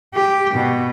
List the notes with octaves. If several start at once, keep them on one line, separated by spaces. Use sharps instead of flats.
G4
B2